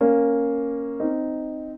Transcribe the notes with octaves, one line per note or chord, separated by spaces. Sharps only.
A#3 C#4
C4 D#4